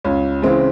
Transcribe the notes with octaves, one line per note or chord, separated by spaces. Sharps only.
C#2 C#4
C#3 E3 G#3 C4